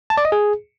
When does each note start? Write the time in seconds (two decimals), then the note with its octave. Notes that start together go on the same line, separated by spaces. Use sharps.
0.10 A5
0.17 D5
0.25 D#5
0.32 G#4